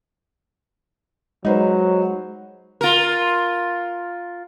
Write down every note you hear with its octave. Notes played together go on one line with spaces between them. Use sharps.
F#3 G#3 D#4 B4 C5
F4 A#4